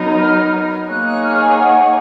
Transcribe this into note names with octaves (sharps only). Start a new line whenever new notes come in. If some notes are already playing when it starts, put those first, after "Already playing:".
Already playing: F#3 B3 D#4 A#4
F6
A#3 D#4 G#4 C#5 F#6
F#6
F6
G#5
F#5